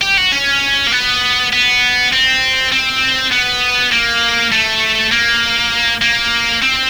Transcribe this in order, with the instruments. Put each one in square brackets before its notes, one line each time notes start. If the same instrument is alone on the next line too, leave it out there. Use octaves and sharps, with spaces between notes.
[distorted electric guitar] G4
F#4
C#4
A#3
B3
B3
C4
C4
B3
A#3
A3
A#3
A#3
C4